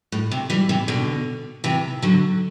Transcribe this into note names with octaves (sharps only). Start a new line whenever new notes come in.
A2
C3
E3 G3
C3 E3
B2 D3
C3 E3
D3 F#3